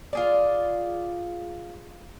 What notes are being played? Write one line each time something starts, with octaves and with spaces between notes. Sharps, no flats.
F4 G#4 D5